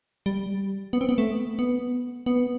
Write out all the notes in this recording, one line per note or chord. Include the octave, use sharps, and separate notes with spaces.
G3
B3
C4
B3
A3
B3
B3